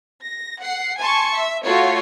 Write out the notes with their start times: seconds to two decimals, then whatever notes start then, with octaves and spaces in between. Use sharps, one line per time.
0.23 A#6
0.60 F#5 C7
0.98 G#5 A5 C6 C#6
1.35 E5
1.65 A3 F4 F#4 C#5